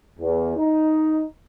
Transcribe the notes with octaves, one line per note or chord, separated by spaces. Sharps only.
E2
D#4